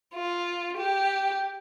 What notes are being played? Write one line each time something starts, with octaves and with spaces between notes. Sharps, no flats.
F4
G4